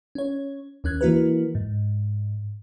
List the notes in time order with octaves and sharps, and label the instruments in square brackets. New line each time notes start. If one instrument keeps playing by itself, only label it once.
[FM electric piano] C#4 C#5
D#2 C#4 F#6 G#6
E3 A#3 E4 F#4 A#4 B4
G#2